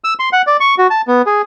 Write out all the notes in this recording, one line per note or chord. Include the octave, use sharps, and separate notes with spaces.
E6
C6
F#5
D5
C#6
F#4
A5
B3
G#4